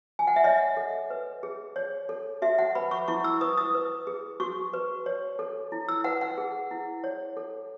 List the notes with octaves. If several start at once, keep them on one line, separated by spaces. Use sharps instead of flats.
G#5
F#5
E5
C#5 D#5
A4
B4
G#4
C#5
A4
F#4 E5
F#5
B4 B5
C#6
E4 C#6
E6
B4 D#6
D#6
B4
G#4
F#4 C#6
B4
C#5
A4
E4
E6
B4 F#5
F#5
G#4
E4
C#5
A4